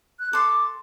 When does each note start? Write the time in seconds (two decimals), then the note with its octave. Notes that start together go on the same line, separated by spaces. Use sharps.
0.19 F#6
0.33 A4 C6 D6